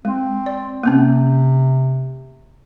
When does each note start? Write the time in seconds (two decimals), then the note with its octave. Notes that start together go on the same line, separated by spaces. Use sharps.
0.05 G#3 C4
0.46 D5
0.83 C3 A#3 C4 C#4